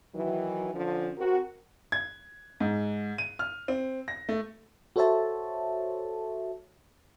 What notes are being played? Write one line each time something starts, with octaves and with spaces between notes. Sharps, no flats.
D#3 E3 F#3
D3 F3 C#4
C4 F#4 A#4
G#6
G#2
D#7
F6
C4
A#6
A3
F#4 A4 C5 C#5 E5 A5